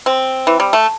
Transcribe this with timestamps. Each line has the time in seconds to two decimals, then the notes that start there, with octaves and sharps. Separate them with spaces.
0.06 C4
0.47 E3
0.60 G3
0.73 A3